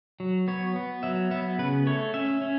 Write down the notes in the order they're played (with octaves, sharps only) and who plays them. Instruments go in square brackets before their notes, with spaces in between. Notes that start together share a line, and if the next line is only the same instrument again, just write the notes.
[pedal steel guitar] F#3
B3 C#5
B3
F#3 E5
B3 E5
C#3 B4
A3 C#5
C#4 E5
C#4